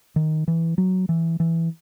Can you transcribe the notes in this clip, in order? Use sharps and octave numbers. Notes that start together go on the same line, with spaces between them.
D#3
E3
F#3
E3
E3